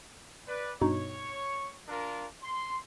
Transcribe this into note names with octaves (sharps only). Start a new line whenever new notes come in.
B4 D5
G2 B2 D#4 C#5 C#6
D4 F4 A#4
C6